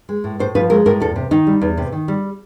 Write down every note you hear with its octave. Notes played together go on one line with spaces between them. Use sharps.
G#3
A2
A2 C5
F3 B4
G#3 A#4
A2 A#4
E2 A4
C3
D#3 D#4
G3
E2
C3
D#3
G3